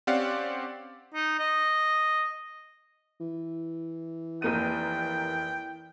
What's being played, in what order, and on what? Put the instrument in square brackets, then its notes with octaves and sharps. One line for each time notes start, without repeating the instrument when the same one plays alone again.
[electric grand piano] C4 C#4 G4 D5 F5 F#5
[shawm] D#4
D#5
[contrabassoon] E3
[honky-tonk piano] F1 A#3 D#7 [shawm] G5